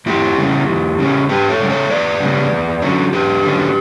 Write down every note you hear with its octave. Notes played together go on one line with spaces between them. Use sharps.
E2 E4 G4
C#3 G3 C#4
E2
C#3 G3 C#4
E2 G4 B4
A4 C#5
C#3 G3 C#4
A4 C#5
E2 B4 D5
C#3 G3 C#4
E2
D3 F#3 C#4
E2 G4 B4
D3 F#3 C#4